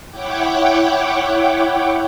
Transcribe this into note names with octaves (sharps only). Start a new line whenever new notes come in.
E4 C#5 F#5 G5 D6